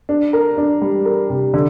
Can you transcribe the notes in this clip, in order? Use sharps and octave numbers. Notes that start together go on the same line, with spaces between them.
D4
A#4
D4
G3
A#4
C3
D3